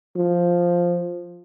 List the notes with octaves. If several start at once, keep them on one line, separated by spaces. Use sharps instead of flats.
F3